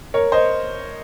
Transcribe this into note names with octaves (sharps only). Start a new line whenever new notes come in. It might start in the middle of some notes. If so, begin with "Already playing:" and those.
A#4 C#5
C5 D#5